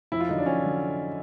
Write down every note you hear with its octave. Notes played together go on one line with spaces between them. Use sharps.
F2 E4
F4
D3 F#3 D#4
D4
F2 C#4
D3 F#3